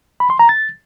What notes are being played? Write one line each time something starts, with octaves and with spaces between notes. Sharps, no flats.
B5
C6
A#5
A6